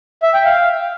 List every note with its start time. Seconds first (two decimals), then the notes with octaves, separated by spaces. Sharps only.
0.23 E5
0.34 G5
0.45 F5